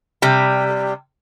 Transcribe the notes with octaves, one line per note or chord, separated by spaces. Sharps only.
C3 G3